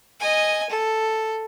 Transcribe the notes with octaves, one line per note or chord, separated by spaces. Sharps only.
D#5 G#5
A4